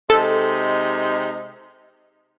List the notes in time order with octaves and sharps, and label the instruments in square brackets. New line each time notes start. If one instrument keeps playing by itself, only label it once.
[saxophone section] C3 G#3 D#4 [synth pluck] A4